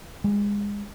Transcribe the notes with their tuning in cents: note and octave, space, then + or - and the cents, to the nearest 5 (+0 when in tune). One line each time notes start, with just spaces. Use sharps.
G#3 -25